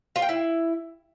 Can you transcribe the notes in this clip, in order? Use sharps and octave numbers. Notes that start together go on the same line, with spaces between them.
F4
G5
E4